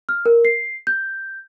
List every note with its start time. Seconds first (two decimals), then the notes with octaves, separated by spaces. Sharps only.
0.09 F6
0.26 A#4
0.45 C7
0.87 G6